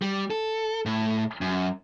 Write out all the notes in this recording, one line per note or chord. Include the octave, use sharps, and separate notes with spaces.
G3
A4
A2
F#2